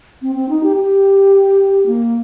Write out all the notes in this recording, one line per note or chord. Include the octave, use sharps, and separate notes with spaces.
C4
C4
D#4
G4
G4
A#3